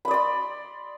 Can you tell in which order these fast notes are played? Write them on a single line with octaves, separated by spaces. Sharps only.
B5 D#5 D5 C6